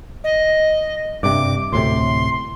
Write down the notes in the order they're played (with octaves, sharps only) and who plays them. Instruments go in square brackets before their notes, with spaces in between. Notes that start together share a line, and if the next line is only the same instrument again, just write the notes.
[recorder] D#5
[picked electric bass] G2 C3 [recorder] D6
[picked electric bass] D2 A2 C3 [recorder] C6